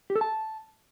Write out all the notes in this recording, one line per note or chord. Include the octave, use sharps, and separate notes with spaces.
G4
A4
A5